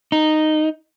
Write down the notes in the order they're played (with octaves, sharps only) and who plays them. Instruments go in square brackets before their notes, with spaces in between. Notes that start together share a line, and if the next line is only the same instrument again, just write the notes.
[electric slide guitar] D#4